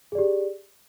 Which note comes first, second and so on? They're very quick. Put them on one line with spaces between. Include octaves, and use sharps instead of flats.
G#4 D5 G4